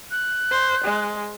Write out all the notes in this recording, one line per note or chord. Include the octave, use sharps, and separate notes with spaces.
F#6
C5
G#3